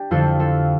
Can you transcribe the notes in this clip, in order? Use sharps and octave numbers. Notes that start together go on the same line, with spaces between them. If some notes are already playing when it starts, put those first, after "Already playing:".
Already playing: D4 G4
F2 D3 F3 F4 A4
F4 A4